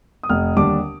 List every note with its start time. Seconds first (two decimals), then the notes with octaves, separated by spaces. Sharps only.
0.23 D#6
0.29 F1 F6
0.56 D#2 D3 G3 D4 D6